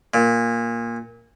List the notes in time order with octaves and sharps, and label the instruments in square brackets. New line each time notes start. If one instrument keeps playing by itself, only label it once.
[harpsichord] A#2